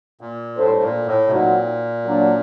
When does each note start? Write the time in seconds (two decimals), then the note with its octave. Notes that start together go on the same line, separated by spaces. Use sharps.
0.21 A#2
0.57 A2 G3 D4 A4 C5
0.81 A#2
1.06 A2
1.27 C3
1.31 A#2 F#3 C4 D#4 F#4
2.04 F#3 A#3 D4